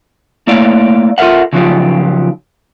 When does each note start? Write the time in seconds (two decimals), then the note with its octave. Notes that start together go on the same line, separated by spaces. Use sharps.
0.47 A3 A#3 E4 C#5 D5 F5
1.18 F4 A4 A#4 E5 F#5
1.53 C#3 F3 F#3 D#4 F4 G4